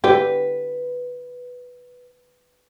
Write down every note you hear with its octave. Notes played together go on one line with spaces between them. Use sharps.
D3 G4 B4